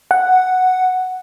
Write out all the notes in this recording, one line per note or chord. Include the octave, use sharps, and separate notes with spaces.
F#5